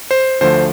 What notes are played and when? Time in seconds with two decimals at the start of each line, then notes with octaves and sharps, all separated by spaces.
0.11 C5
0.41 D2 D3 F3 A3 C5